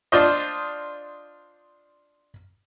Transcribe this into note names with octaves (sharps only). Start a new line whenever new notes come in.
D4 F4 C5 D#5